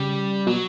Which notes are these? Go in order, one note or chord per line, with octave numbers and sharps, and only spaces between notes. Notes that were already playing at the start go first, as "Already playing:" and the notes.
Already playing: C#3 G3
B2 F#3